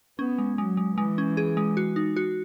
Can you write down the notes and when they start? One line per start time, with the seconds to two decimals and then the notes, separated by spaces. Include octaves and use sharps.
0.19 B3 C#4
0.38 G#3
0.58 F#3 G#3
0.77 G#3
0.98 E3 G#3
1.18 C#4
1.37 G#4
1.57 G#3
1.77 F#4
1.96 D#4
2.16 F#4